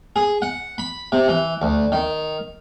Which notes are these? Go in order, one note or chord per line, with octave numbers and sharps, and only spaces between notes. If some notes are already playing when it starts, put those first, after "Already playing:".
G#4
F#5
B5
C3
E3
D2
D#3